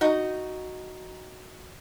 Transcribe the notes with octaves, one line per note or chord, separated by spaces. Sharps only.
D#4 F#4